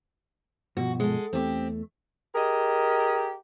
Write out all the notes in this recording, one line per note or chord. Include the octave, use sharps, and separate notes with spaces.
G2 B2 F3 F#4
G#3 A4
E2 A3 C4 G4
G4 G#4 A#4 D#5